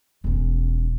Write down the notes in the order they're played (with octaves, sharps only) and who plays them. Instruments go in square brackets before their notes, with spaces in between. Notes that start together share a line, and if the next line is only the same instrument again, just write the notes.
[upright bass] E1 C#4